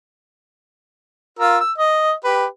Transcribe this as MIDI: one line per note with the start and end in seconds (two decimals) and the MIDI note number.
1.39 1.58 65
1.39 1.58 70
1.39 1.58 88
1.60 1.72 88
1.78 2.12 75
2.24 2.46 67
2.24 2.46 71